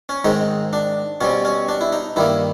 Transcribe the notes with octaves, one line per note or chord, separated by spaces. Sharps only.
C#4
G#2 D#3 G#3 C4 D#4
D4
B2 G3 C4 C#4
C#4
D4
E4
D#4
G2 D#3 G3 A#3 E4